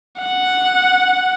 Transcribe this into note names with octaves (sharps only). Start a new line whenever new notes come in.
F#5